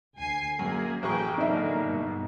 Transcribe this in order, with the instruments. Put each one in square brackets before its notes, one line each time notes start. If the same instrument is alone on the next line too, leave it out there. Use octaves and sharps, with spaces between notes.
[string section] D2 G#5 C7
[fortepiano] F#2 [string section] A#3 G#4
[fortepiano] A1 G#4 C#6 [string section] G5
[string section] D3 F#3 A#3 [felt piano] D#4 E5
[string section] G2 B2